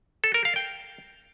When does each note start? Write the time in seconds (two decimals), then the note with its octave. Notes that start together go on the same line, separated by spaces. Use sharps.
0.24 A4
0.34 A#4
0.45 F5
0.56 G5